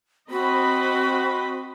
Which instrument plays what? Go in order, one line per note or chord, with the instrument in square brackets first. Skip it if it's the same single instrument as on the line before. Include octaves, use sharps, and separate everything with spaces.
[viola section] C4 D#5 B5 [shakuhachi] F#4